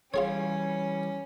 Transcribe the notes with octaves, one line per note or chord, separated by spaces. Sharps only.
E3 G3 C#4 F4 G#4 C#5